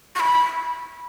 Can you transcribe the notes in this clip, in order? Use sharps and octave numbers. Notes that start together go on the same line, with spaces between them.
C#6
B5